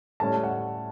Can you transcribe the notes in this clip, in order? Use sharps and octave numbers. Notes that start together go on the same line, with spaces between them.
A2 G3 C#4 A5
F#5